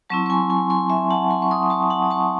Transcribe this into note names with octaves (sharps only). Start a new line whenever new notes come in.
F#3 C4 E4 A5 C#6
C#6
G#5 C6
G#5 C6
G#5 C6
E5 G#5
F#5 A5
G#5 C6
C#6
C6 D#6
A5 C#6
F#5 A5
D#6
A5 C#6